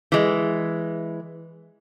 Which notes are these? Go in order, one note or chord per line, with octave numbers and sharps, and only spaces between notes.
E3 G#3